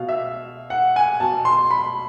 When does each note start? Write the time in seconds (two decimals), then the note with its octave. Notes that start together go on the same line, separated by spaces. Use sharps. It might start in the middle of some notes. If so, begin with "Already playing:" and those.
Already playing: B2 F5
0.09 E5
0.70 F#5
0.96 G#5
1.20 B2 A5
1.45 C6
1.71 B5